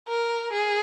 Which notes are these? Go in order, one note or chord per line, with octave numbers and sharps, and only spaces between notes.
A#4
G#4